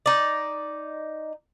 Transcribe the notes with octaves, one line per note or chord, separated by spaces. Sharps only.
D#4 D5